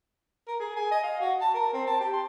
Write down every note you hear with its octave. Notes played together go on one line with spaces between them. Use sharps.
A#4
G#4
G#5
D#5
F5
F#4
A5
A#4
C4
A5
G4
C6